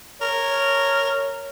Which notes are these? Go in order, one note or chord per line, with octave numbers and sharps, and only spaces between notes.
A#4 C#5